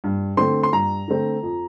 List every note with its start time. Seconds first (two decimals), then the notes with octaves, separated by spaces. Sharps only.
0.04 G2
0.37 D3 A3 C4 C6
0.63 C6
0.72 G2 A#5
1.08 D3 A3 C4
1.43 F2